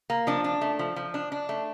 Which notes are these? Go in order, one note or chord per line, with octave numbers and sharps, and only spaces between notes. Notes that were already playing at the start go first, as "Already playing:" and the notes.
A#3
F3 D4
D4
A3
F3
F3
D4
D4
A3